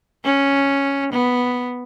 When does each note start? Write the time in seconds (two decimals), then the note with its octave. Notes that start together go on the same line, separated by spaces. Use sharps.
0.25 C#4
1.13 B3